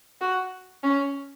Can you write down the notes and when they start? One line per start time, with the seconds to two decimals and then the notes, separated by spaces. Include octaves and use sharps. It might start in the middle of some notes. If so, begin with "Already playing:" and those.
0.21 F#4
0.83 C#4